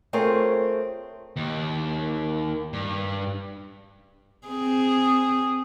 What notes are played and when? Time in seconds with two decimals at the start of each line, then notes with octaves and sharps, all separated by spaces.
0.13 A3 C4 F4 G#4 A#4 C#5
1.36 D#2
2.73 G2
4.47 C4 G#4